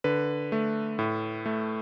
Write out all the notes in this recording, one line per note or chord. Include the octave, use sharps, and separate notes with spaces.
D3 B4
A3
A2
A3